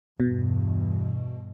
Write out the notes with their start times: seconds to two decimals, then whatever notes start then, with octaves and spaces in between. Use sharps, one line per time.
0.20 E2 G2 B2